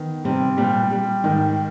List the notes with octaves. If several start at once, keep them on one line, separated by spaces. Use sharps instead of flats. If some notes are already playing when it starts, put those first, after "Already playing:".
Already playing: D#3 B3
C3 G3
A#2 G3
G3
G#2 D#3